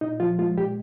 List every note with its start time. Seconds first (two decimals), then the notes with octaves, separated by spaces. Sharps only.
0.01 A#2 D#4
0.20 F3 F4
0.39 G#3 F4
0.57 A#2 G4